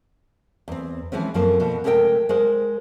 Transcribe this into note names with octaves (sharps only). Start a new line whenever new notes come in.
E2 C4
E3 F3 G#3 C4 C#4
F#2 F3 A3 A#3 C4
B2 F3
C3 G#3 A3 A#4 D5 G5
G#3 G#4 A#4 C5